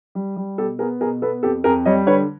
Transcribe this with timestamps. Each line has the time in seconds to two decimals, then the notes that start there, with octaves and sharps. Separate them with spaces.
0.15 G3
0.36 G3
0.58 B2 G4 A4
0.79 B3 G#4 A#4
1.01 B2 G#4 A#4
1.22 B3 A4 B4
1.43 F2 G4 A4
1.64 F2 G#4 A#4
1.86 G3 C#5 D#5
2.07 D3 B4 C#5